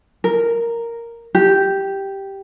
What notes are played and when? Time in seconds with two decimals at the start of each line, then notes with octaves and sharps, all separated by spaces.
0.24 A#4
1.35 G4